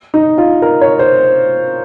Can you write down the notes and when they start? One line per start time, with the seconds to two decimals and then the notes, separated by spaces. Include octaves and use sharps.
0.14 D#4
0.38 F4
0.62 A#4
0.81 C#5
0.99 C5